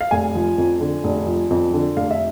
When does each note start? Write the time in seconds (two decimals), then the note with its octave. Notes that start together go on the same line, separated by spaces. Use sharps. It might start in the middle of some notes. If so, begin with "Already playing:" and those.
0.01 F5
0.11 F1 G#5
0.35 F3
0.58 F2
0.81 D3
1.04 F1
1.27 F3
1.50 F2
1.73 D3
1.96 F1 F5
2.11 E5